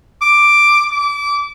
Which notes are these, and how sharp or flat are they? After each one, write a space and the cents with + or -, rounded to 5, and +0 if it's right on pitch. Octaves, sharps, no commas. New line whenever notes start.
D6 +5
D6 -25